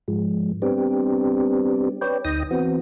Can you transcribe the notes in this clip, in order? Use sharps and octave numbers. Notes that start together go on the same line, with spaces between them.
G#2 F3 G#3
G3 B3 C4 D4 G4
B4 C#5 D5 G5
D2 D#4 G5 D#6 A#6
E3 B3 C4 F#4